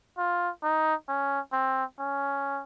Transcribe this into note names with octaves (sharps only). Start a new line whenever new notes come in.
F4
D#4
C#4
C4
C#4